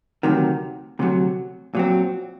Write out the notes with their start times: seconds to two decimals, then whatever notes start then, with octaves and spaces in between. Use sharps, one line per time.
0.23 D2 C3 D#3 F#3
0.99 D2 C3 D#3 F#3
1.75 A#2 F#3 C4